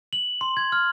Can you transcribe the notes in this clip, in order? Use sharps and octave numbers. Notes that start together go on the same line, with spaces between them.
F#7
C6
G#6
F6